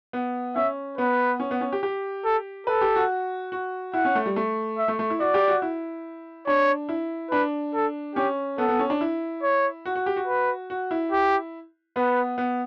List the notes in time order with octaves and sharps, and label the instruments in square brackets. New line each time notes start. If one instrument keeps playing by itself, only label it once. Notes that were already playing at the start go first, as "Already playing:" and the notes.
[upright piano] B3
[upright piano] C#4 [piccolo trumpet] E5
[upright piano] B3 [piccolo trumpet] B4
[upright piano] C#4
B3
C#4
G4
G4
[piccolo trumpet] A4
[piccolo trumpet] A4 [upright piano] B4
[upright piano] G4
F#4
F#4
[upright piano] E4 [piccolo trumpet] F#5
[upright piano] C#4
A3
G3
A3
[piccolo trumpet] E5
[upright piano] A3
A3
E4
[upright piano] F#4 [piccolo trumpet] D5
[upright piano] G4
F#4
E4
[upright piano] D4 [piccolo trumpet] C#5
[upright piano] E4
[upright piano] D4 [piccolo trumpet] B4
[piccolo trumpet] A4
[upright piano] C#4 [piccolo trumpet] G4
[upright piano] B3 [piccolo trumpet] A4
[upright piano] B3
C#4
D4
E4
[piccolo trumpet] C#5
[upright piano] F#4
F#4
G4
F#4
[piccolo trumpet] B4
[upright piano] F#4
E4
[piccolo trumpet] G4
[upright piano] B3 [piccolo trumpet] B4
[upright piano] B3